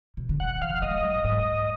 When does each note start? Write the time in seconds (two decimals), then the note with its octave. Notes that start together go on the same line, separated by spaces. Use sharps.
0.17 B2
0.29 D3
0.40 D#3 F#5
0.61 F3 F5
0.82 G#3 D#5
1.03 F#3
1.15 A#2
1.24 G#2